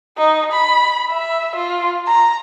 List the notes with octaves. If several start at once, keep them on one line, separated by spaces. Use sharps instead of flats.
D#4
B5
E5
F4
A#5